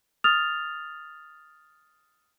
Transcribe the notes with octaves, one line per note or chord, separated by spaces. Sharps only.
D#6 F6 A6 F7